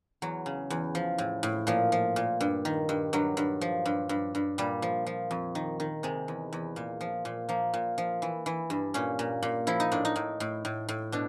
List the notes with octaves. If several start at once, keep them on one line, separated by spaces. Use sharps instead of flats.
E2 F#3
C#3
E2
F3
A2
A2
A#2 F3
F3
A#2
G2
D#3
G2
G2 F#3
G2
F3
G2
G2
G2
A#2 G3
F3
F3
F2
D#3
D#3
C3 G#3
E2
E2
A#2
F3
A#2
F3 A#3
A#2
F3
E3
E3
G2
A#2 C#4
A#2
A#2
F3 E4
D#4
A2 D4
D#4
A2
A2
A2
A2
B2 D4